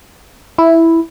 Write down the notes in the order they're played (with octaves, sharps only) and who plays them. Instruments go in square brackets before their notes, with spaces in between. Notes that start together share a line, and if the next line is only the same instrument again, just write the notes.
[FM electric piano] E4